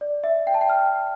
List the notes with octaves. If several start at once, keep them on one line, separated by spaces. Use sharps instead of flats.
D5
E5
G5
A5
G5
F6